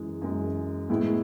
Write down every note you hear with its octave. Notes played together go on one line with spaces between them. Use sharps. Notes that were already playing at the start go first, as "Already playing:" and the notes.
Already playing: F#2 E3 G#3
F#2 E3 G#3
A2 G#3 B3 E4